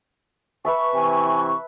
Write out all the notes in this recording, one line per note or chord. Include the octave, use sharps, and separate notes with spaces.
B4 E5 A5 C#6
C3 E3 G#5